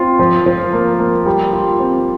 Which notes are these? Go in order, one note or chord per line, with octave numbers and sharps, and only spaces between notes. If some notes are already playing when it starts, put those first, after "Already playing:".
Already playing: C4 F4
F3
F3
A#3
A#3
G3
F4
C4